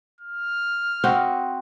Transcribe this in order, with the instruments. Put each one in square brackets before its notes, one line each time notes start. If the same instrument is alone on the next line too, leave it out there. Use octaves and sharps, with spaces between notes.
[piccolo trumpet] F6
[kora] C4 F#4 D#5